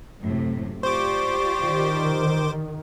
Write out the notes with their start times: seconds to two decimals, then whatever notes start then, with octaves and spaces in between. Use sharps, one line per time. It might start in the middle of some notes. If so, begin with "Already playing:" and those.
0.22 F#2 A2 C3
0.83 F4 G4 C5 D5 C#6 D6
1.62 D#3